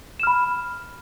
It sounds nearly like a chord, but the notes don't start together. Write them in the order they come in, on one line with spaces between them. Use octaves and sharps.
E7 F6 B5